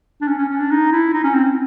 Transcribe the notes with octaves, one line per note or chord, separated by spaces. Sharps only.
D4
C#4
C#4
C#4
D4
D#4
E4
D#4
C#4
C4